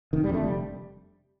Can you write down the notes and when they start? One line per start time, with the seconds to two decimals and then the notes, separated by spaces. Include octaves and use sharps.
0.13 F1 D#3
0.24 G3
0.29 F2 D3 A3
0.43 F1 G3